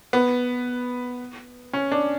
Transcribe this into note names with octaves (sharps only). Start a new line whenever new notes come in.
B3
C#4
D4